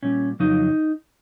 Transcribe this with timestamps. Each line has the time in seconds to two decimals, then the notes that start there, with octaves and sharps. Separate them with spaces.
0.03 A#2 G3 C#4
0.40 F2 C#3 F#3 D#4